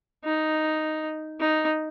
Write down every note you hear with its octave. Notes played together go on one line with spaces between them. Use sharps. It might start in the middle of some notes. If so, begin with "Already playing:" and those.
D#4
D#4